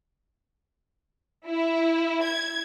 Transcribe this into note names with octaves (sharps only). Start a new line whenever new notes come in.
E4
G#6